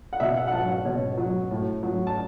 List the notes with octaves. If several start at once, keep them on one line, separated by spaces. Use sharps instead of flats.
F#5
B2 E5
F#5
F#5
F#3 A5
F#5
B2 C#5
F#3
A2
F#3
A5